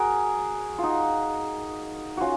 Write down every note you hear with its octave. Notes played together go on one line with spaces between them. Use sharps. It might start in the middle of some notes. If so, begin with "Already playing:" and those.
Already playing: F#4 G#4 A#4
D#4 F4 F#4
C#4 F4 F#4